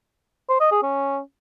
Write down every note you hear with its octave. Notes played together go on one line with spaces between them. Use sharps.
C5
D#5
G#4
C#4